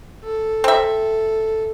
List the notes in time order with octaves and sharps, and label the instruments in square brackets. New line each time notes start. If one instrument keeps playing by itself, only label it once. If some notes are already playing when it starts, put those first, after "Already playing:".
[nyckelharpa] A4
[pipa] C4 E5